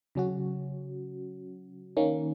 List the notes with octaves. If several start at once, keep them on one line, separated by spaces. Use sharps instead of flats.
C#3 F#3 C#4 F#4
D#3 A#3 C#4